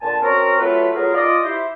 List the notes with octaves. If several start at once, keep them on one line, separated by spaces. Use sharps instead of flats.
A#2 D3 G#5 A5
C4 C#4 F#4 A#4
F#3 A3 F4 B4
F#3 B3 F4 G#4 A#4
F4 D5 D#5
E4 G4 C5